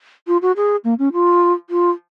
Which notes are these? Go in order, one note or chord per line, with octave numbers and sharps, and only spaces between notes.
F4
F#4
G#4
A#3
C#4
F4
F4